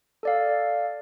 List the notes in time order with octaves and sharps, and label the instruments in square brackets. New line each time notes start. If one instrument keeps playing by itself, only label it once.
[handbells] A4 D5 F5